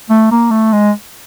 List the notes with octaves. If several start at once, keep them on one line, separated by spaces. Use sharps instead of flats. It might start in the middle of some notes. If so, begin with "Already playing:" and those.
A3
A#3
A3
G#3